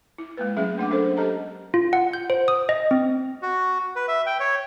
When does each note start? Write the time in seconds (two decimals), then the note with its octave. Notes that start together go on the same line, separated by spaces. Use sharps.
0.18 E4
0.37 G#3 A#3 B4
0.57 F#3 A3 C#4 G#4 E5
0.78 A#3 D4 F#5 D6
0.91 C#4 A4 A#4 C5
1.17 G4 A4 D#5 A5 A#5
1.74 F4
1.93 F#5
2.13 G6
2.30 C5
2.48 D#6
2.69 D#5
2.91 C4
3.42 F#4
3.96 B4
4.08 E5
4.26 G5
4.40 C#5